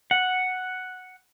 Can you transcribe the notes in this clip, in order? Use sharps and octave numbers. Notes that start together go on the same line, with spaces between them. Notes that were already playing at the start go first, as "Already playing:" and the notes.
F#5